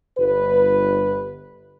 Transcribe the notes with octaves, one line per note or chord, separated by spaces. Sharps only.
G1 B4